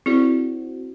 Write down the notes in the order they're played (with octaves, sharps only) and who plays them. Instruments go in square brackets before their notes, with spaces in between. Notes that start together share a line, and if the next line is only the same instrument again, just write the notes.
[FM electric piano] C4 F#4 [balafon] E4 G#4 D5